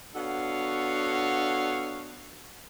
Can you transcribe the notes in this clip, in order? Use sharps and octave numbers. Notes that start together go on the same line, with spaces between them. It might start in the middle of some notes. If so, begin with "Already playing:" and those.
B3 D4 F#4 A4 C#5 F5